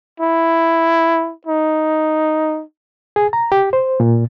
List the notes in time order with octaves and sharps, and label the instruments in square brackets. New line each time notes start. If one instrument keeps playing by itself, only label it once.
[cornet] E4
D#4
[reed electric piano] G#4
A#5
G4
C5
A#2